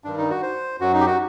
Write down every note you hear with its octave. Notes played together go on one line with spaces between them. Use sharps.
G2 D#3 G3 D4
D#4
F#4
C5
F#2 F#3 F#4
D#4
G4
F#4